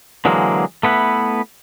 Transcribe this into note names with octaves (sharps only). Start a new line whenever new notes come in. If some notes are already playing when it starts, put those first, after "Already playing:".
D3 E3 F#3 G#3 A#3
A3 B3 E4 B4